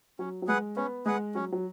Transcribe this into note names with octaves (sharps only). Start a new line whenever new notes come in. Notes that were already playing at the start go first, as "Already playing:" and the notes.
F#3 C#4
F#3
G#3 G#4 B4 F#5
B3 C#4
G#3 G#4 B4 F#5
F#3 C#4
F#3